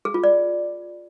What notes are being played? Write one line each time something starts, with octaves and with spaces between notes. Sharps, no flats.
G#4
F4
D5